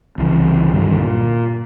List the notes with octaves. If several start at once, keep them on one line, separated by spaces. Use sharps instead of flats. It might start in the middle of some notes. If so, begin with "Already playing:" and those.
C2 C#3 E3
G2 D3 D#3 F#3
A#2